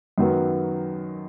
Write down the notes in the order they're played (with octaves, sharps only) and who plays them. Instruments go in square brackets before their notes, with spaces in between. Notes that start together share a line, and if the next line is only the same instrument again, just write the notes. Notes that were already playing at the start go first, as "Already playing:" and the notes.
[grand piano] F#2 D#3 F#3 B3